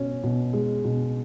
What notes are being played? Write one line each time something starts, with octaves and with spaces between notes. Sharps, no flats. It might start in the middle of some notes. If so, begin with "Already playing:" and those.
Already playing: B2 C#4
B2
G#3
B2